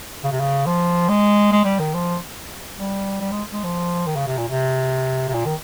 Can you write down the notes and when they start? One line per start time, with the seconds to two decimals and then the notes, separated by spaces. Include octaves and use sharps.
0.24 C#3
0.32 C3
0.40 C#3
0.66 F3
1.09 G#3
1.52 G#3
1.64 G3
1.79 D#3
1.94 F3
2.78 G3
3.21 G3
3.31 G#3
3.53 G#3
3.64 F3
4.06 D#3
4.16 C#3
4.27 C3
4.37 A#2
4.48 C3
5.28 C3
5.33 A#2
5.46 D#3